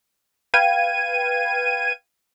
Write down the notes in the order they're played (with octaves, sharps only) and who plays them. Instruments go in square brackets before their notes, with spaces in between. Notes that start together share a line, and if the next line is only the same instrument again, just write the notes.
[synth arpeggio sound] B4 F5 G5 G#6 D#7